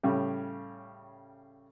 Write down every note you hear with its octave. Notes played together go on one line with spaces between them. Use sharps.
A2 C#3 G3